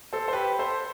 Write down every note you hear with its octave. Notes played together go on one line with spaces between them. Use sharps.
A4 C5
C5
G4 B4
A4 C5